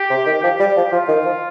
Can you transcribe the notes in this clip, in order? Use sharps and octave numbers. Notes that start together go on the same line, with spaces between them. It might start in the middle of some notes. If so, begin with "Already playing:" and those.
Already playing: G4
C3
D#3
F3 G4
G3
F3
F3 F4
D#3
F3